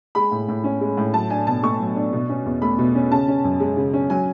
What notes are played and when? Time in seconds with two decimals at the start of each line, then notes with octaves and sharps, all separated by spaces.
0.15 G#3 B5
0.32 A2
0.48 A2
0.64 C#4
0.81 G#3
0.97 A2
1.14 F#3 A5
1.30 D4 G#5
1.47 B2 A5
1.63 A3 C#6
1.80 F#3
1.96 D4
2.13 B2
2.29 C#4
2.45 E2
2.62 A3 B5
2.78 B2
2.95 C#4
3.11 C#3 A5
3.28 C#4
3.44 F#2
3.60 G#3
3.77 C#3
3.93 C#4
4.10 F#3 G#5